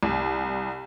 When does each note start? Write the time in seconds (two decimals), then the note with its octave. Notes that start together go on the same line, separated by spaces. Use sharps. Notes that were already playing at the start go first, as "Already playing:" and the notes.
0.03 C2